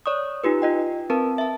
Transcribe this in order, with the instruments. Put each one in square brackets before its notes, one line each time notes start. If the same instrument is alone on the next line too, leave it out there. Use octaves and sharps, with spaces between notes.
[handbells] C#5 D5 C#6 D#6
D#4 F4 G4 B4
F4 D#5 G5
C4 A#4 B4 A5
E5 A5